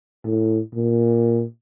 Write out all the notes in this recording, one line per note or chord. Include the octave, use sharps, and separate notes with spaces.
A2
A#2